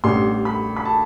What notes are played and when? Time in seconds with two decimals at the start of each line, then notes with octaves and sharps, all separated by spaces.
0.04 A1 A2 G3 D4 C6
0.45 B5
0.77 B5
0.85 A5